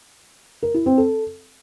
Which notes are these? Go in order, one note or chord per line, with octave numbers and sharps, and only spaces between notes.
A#4
E4
C4
A4